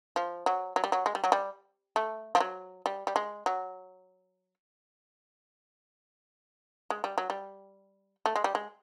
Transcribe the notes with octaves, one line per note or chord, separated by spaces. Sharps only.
F3
F#3
F#3
G3
F#3
G#3
G3
F#3
G3
A3
F3
F#3
G3
G3
G#3
F#3
G#3
G3
F#3
G3
A3
G#3
G3
G#3